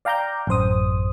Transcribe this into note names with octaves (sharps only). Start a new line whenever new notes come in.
D5 F5 G5 A#5 D6 G6
A1 F#2 C5 D#6